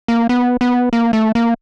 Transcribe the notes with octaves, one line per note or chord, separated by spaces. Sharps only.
A#3
B3
B3
A#3
A3
A#3